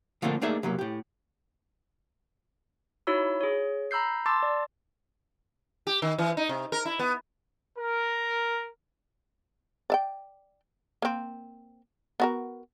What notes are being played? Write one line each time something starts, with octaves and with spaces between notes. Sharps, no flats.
D3 F3 A3 A#3 C4 D4
A3 A#3 D4 D#4 G#4 E5
C2 F#3 A#3
A2 G4
D#4 E4 F#4 C#5 B5 E6
G#4 C#5
A#5 B5 E6 G6 C7
A5 C6 D6 E6 A6
D5
G4
D#3
E3
D#4
C3
A#4
E4
B3
A#4
D5 E5 G5
A#3 C4
B3 F#4 A#4